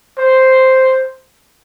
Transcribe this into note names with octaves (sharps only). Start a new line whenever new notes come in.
C5